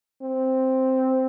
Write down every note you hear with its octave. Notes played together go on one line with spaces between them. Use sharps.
C4